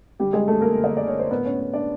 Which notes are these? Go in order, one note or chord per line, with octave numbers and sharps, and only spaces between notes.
D3 G3 G4
G#3 G#4
D3 A3 A4
A#3 A#4
D3
D#5
D5
D3 C#5
C5
A2 B3 B4
C#4 C#5
B3
D4 D5